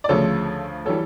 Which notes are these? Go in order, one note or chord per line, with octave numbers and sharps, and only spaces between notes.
D5
D2 C#3 F3 A3 A4 C#5
E3 G3 A4 C#5